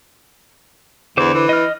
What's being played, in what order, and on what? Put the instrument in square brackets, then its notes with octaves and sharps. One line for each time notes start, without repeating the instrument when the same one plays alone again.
[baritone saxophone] E2 [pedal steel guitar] D3 C5 D6
[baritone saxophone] E3
[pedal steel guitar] D#5 F6